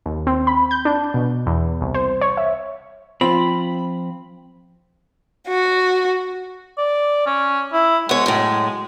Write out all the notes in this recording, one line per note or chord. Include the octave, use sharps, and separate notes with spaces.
D#2
C4
B5
G6
D4
B2
E2
C2
C5
C#5
E5
F3 C4 F4 B5
F#4
D5
C#4
E4
G#3 B3 C#5
F#2 A2